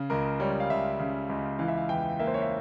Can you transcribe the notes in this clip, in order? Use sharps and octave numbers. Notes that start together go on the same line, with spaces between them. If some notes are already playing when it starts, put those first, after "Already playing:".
Already playing: C#3
C#2 A#4
G3 C#5
F5
C#2 E5
C#3
C#2
E3 F5
E5
F5
E2 G5
A#3 E5
C5
C#5
E5